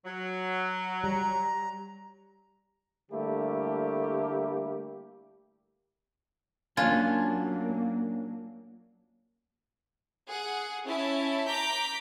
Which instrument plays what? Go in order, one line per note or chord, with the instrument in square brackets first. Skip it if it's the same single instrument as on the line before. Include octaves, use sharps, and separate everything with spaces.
[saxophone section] F#3
[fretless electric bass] G3 [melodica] A#5
[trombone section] D3 G3 A3 A#3 E4 G4
[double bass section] F#3 A#3 [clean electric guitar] C#4 D4 G#5 [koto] F4
[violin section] G#4 F#5
C#4 E4 A5
A#5 D6 G6 B6